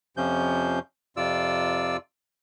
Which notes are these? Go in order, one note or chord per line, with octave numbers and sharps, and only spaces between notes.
F2 C3 F3 C#4 G6
F2 C3 F4 D5 E6